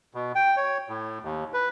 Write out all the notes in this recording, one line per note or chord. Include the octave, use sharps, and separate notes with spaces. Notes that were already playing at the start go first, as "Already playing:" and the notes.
B2
G5
C#5
A2
D#2
B4